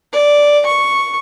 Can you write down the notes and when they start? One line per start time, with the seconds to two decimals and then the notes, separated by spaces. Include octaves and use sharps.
0.13 D5
0.66 C#6